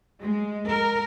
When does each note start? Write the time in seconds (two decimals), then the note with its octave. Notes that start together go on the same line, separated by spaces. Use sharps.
0.20 G#3
0.68 A#4